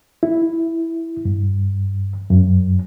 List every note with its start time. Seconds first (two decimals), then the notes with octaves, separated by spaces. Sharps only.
0.23 E4
1.25 G2
2.30 F#2